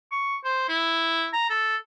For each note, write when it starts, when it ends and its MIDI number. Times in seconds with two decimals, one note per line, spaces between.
0.12 0.37 85
0.45 0.66 72
0.69 1.28 64
1.33 1.49 82
1.50 1.76 69